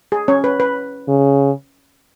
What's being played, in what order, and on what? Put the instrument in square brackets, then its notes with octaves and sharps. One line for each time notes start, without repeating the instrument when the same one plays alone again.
[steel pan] G#4
C#4 C#5
B4
B4
[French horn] C#3